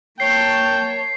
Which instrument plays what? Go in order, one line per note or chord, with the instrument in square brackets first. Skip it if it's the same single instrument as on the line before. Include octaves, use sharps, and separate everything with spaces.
[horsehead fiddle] A#3 A5 [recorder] C#5 [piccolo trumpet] G5 [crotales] C7